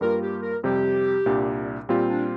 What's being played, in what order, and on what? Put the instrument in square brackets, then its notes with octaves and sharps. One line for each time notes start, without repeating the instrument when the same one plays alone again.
[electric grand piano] G2 G3 A#3 F4 [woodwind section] A#4
[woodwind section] G4
A#4
[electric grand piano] F2 C3 G3 [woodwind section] G4
[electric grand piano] C2 A#2 G3 D4
[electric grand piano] A#2 G3 C4 F4 [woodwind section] G4
[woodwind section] D4